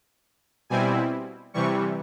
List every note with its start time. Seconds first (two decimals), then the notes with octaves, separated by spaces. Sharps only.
0.70 B2 G3 C4 E4 G#5
1.54 C3 E3 G3 C#6